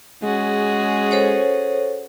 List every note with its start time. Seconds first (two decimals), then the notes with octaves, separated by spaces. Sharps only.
0.23 G#3 C#4 F#4 G#4
1.11 A4 C5 C#5